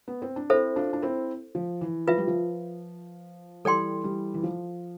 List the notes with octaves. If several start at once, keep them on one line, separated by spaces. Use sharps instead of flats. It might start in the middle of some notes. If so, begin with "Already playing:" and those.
B3
C4
D4
C4 E4 A4 C5 E5
D4 F4
D4
C4 E4
F3
E3
F3 F4 B4 E5
G3
F3
E3 G3 A4 D5 G5 C6
E3 G3
E3
F3